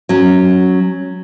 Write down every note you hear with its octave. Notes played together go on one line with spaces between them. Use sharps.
F#3 C#4